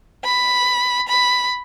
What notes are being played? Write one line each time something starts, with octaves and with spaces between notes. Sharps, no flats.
B5
B5